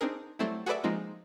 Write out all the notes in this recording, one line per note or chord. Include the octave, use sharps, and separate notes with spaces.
C4 D4 D#4 G#4 A#4
F#3 G3 A3 C4 E4
F#4 G#4 A4 B4 D5 E5
F3 G#3 A#3 C4 D#4 F4